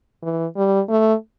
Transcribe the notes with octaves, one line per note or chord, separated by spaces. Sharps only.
E3
G3
A3